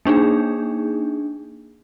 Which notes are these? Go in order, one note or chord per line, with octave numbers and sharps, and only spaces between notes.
A#3 D4 D#4 G#4